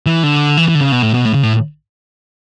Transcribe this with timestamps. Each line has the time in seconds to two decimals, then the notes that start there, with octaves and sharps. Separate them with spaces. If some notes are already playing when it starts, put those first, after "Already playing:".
0.06 E3
0.23 D3
0.57 E3
0.68 E3
0.75 D3
0.80 C#3
0.92 B2
1.02 A2
1.14 B2
1.25 A2
1.34 C#3
1.43 A2